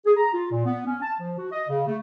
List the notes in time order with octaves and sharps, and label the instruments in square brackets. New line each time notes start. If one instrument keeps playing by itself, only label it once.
[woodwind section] G#4
A#5
F4
A#2
B3
C#4
A5
F3
F#4
D#5
C#3
A3